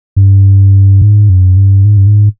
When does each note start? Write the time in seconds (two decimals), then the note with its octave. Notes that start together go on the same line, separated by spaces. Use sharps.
0.16 G2
1.02 G#2
1.29 F#2
1.57 G2
1.85 G#2
1.97 G2
2.07 G#2